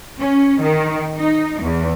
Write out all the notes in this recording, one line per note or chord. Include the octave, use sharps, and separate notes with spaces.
C#4
D#3
D#4
E2